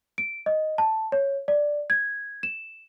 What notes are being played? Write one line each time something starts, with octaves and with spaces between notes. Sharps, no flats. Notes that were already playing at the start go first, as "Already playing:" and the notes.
D7
D#5
A5
C#5
D5
G#6
E7